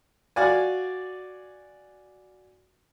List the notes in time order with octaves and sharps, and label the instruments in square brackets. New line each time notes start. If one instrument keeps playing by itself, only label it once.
[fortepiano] F#4 D5 F5 G#5